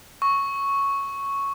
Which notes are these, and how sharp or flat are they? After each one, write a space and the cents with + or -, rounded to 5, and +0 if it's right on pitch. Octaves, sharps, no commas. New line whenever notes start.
C#6 +0 E6 -20